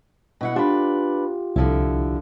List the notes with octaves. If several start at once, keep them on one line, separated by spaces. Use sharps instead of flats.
B2 E4 F#5
D4 F4 G4 B4
C2 D3 F3 E4